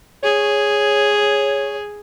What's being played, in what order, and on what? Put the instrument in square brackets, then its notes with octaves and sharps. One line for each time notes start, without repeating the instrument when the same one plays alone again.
[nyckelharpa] G#4 [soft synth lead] C#5